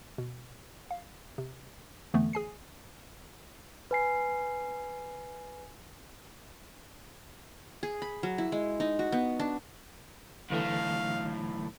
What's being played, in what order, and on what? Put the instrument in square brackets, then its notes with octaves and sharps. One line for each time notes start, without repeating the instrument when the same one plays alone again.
[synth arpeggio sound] B2
F5
C3
F2 D3 E3 A3 B3
G#4 G#5 C7
[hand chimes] B4 G#5 C7
[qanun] G#4
B5
F#3
E4
G#3
D#4
F#4
B3
D4
[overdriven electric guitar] B1 A2 [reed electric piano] D3 E3 A3 [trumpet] F5